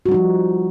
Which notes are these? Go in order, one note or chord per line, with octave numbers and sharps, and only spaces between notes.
F3 G3 D#4 F#4